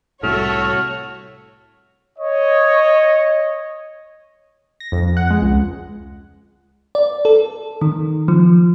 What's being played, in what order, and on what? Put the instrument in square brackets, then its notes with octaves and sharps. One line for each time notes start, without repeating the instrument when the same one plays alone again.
[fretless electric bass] C2 A2 [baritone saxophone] A3 [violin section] F#4 C#5 [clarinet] F6
[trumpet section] C#5 D#5
[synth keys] A#6
F2
F#5
G#3
C#2
[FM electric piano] D5
A4
D#3
F3